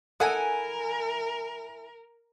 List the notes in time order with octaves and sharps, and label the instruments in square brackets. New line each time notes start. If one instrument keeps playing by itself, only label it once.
[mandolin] E4 G#5 [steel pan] A4 D#6 [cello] A#4 [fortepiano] F#5